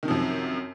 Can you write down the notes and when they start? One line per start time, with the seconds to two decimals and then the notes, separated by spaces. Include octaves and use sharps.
0.03 D#3
0.05 C3
0.08 F3
0.11 F#2